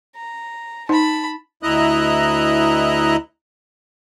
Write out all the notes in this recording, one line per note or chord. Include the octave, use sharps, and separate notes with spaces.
A#5
D#4 A5 B5
D2 E4 D#5 A#5 F#6